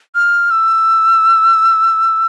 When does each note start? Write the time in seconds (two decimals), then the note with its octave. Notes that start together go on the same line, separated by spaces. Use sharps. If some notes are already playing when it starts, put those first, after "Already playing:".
0.15 F6
0.51 E6